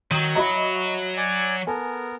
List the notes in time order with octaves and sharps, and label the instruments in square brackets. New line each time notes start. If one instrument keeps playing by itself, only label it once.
[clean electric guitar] D#3 [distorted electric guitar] F#3 [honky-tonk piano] D#6 D#7
[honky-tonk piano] F#4 D#5 E5 [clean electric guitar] A#5 B5
[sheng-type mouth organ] D5 G#5
[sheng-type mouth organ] B3 A#4 [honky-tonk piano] A4 G#5